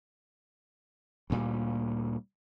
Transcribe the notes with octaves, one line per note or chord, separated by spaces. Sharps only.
D2 A#2 G3